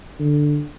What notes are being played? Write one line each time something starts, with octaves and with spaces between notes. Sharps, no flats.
D3